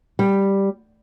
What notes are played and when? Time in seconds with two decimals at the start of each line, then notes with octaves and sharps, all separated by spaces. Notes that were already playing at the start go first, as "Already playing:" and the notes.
0.19 G3